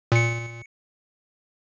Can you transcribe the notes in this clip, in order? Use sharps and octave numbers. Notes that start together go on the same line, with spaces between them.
A#2 C#7